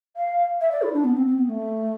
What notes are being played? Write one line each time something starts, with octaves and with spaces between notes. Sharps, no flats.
F5
E5
D5
E4
D4
B3
C4
C4
B3
A3